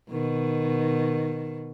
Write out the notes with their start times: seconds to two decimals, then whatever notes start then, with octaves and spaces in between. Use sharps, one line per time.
0.10 B2 D#3